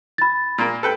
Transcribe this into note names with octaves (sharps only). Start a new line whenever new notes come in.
B5 A6
A#2 A#3
A4 B4 G5